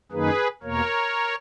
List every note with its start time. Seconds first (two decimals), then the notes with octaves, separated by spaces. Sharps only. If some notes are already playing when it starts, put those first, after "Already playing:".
0.12 F#2 D#3 A#3 D#4 G#4 B4
0.63 E2 B2 A#3 A#4 C#5